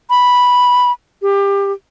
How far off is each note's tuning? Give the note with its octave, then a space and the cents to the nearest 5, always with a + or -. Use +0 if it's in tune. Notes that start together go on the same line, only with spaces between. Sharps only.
B5 -5
G4 +25